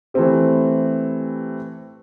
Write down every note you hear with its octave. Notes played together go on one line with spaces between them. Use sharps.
E3 A3 C4 G4